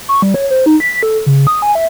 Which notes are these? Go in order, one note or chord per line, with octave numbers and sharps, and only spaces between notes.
C#6
G3
C#5
C5
D#4
B6
A4
C#3
D#6
G#5
E5